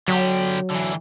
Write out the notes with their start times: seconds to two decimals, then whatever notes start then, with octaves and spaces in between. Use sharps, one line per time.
0.08 D3 F#3 G4
0.71 D3 E3